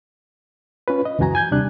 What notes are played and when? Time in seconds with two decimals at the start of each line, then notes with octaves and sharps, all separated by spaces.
0.88 C#4 F4 B4
1.05 D#5
1.19 C#2 F#2 E3 F#4 G#5 A#5
1.35 G#5 G6 G#6
1.51 D#2 C3 G3 D4 F#6